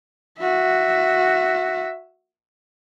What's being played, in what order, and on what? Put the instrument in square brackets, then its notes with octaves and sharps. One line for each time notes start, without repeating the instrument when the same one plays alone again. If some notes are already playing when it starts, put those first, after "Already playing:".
[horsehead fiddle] F#4 E5